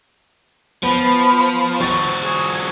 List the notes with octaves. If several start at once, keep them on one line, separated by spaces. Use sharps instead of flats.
F3 B3 B5
F3 F#4 C#6 A6
G#4